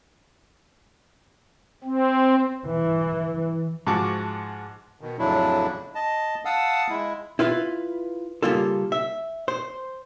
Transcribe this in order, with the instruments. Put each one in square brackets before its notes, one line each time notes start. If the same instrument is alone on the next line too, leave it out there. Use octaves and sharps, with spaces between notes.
[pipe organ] C4
[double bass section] E3
[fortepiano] G#2 F3 F#4 A5 C#6 D6
[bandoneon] B2 D#3
F2 A2 C#3 F#3 D4 E4
D#5 A5
F5 F#5 A5 D#6 E6
G#3 E4
[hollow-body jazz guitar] E4 F4 B4 F5
C#3 G3 A#3 F4 A4
E5
C5